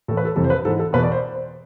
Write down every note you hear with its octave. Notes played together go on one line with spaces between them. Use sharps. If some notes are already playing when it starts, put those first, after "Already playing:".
A2 E3 A4
B4
A4
F2 C3 E3 A4
C5
B4
G#2 E3 A4
A4
E2 B2 B4
D5
C5